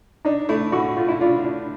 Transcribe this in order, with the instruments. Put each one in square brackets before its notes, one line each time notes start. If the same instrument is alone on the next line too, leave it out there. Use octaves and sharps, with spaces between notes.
[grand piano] D4 [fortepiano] D#4
[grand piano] A3 [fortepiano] E4
[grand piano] A2 [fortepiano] F#4
[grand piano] A3 [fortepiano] F4
[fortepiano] E4
[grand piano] D4 [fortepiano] F4
[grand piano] D4